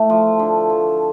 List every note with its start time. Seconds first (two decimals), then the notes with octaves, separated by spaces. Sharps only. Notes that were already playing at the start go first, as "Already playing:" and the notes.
Already playing: A2 A3
0.10 F3
0.39 D3
0.70 F3